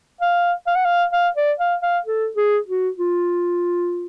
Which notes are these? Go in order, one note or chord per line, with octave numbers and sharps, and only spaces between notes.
F5
F5
F#5
F5
F5
D5
F5
F5
A4
G#4
F#4
F4